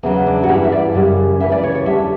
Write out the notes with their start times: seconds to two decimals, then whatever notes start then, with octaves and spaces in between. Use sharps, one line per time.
0.03 E2 C#3 F#3 B3
0.26 D4
0.43 F#4
0.48 G2 E3 G3 E4
0.64 E5
0.72 D5
0.94 F#2 C#3 G3
1.40 D2 C#3 E3 E5
1.52 D5
1.63 C#5
1.75 C#5
1.86 E2 D3 G3 E5